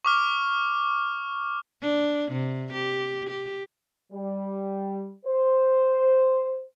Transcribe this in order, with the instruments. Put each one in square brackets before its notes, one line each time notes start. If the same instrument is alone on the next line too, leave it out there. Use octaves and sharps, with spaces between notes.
[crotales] C#6 D6 F6
[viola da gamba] D4
C3
G4
G4
[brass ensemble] G3
C5